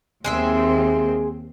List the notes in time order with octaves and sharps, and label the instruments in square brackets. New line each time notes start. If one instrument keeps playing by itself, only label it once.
[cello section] D#2 C4 [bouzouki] G#3 G#4 E5